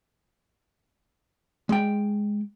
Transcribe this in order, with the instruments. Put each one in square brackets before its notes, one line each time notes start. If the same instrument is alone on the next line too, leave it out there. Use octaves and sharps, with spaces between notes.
[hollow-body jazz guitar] G#3 G5